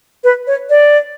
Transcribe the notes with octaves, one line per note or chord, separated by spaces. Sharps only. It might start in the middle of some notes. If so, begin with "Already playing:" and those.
B4
C#5
D5